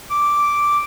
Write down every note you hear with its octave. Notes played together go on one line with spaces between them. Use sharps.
D6